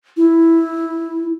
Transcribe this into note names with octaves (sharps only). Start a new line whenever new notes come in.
E4